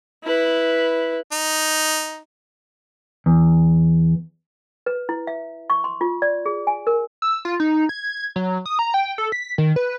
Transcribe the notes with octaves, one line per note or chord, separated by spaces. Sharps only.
E4 B4
D#4
E2
B4
E4
E5
C#6
C6
F4
D5
G#4
G#5
A#4
E6
F4
D#4
G#6
F#3
D#6
A#5
G5
A4
B6
D#3
B4